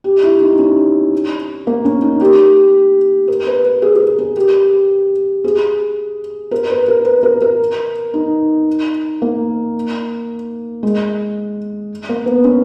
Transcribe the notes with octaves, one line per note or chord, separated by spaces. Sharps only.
G4
E4
D#4
C#4
A#3
C#4
D#4
G4
A#4
B4
B4
G#4
G#4
A#4
G#4
G4
G#4
A#4
B4
A#4
B4
A#4
A#4
D#4
A#3
G#3
A#3
B3
C#4